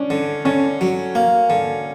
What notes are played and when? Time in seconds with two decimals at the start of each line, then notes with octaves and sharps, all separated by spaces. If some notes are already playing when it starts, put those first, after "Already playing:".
Already playing: C#4 D4
0.10 D3
0.45 D3 C#4
0.81 F#3
1.15 A#3
1.50 D3